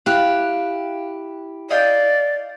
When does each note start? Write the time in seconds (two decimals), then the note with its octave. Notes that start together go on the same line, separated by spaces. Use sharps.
0.06 E4 G4 F5 F#6
1.70 D5 D#5 F5 G5